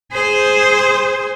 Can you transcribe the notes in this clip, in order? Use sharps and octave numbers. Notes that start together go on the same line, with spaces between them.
G#4 C5